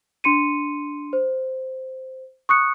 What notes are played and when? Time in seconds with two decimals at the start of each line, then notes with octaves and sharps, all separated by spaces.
0.24 D4 C6 C#7 D#7
1.13 C5
2.49 C#6 D#6 F#6 C#7